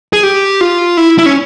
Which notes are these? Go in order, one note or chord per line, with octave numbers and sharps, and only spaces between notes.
G#4
G4
F4
E4
E4
C#4